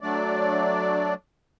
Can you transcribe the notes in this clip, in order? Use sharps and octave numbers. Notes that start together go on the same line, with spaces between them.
F#3 A3 D4 D5